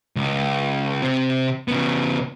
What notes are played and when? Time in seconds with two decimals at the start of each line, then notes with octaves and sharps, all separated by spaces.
0.16 C#2
1.02 C3 C4
1.68 C#3 B3